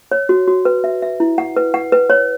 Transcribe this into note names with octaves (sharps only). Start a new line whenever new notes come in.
C#5
F#4
F#4
B4
E5
E5
E4
F#5
B4
F#5
B4
C#5